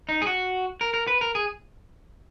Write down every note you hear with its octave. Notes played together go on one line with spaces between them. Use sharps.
D#4
G#4
F#4
A#4
A#4
B4
A#4
G#4